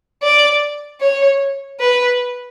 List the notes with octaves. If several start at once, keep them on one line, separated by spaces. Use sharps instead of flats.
D5
C#5
B4